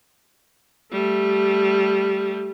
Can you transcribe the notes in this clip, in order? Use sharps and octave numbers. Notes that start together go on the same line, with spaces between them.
G3 A3